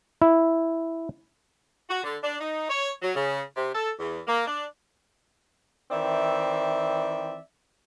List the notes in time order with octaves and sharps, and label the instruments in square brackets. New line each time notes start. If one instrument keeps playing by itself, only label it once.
[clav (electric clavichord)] E4
[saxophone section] F#4
D3
D4
D#4
C#5
F#3
C#3
C3
A4
E2
A#3
D4
D#3 E3 C4 D5 E5